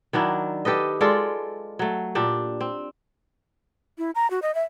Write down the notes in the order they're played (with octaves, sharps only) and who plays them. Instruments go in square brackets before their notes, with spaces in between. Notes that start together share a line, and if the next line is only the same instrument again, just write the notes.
[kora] D#3 F#3 D4 E4
G4 A4 B4 D#5
G#3 F4 A4 D5
F#3 A3
A#2 D4 G4
C4
[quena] E4
A#5
F#4
D#5
E5